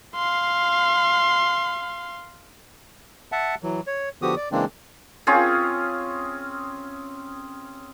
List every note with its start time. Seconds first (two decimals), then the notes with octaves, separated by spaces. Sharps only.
0.15 F5 C6
3.32 E5 F#5 A5
3.63 E3 F#3
3.87 C#5
4.22 D3 F3 B3 F#4 G4 D#6
4.36 D5
4.52 C#3 E3 G#3 A#3 C4 D4
5.27 C4 C#4 F4 G#4